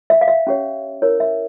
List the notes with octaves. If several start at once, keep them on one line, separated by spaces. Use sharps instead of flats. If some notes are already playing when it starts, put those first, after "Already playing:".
E5
F5
E5
C#4 G4 C#5
E4 A#4 C#5
E5